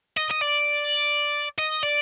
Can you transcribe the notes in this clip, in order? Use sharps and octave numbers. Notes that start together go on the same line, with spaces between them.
D#5
D#5
D5
D#5
D5